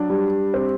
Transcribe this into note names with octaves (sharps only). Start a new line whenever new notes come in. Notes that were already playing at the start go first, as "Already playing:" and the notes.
Already playing: F#3 D4
G3
C4